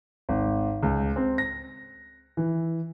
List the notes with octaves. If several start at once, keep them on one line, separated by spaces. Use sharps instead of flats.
G#1
C#2
C4
A#6
E3